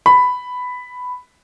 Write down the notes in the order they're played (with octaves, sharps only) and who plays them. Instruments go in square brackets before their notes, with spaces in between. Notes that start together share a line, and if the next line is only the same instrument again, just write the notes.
[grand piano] B5